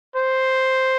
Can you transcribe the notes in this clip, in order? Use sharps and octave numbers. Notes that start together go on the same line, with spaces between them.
C5